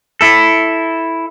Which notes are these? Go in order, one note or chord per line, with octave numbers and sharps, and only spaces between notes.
E4 A4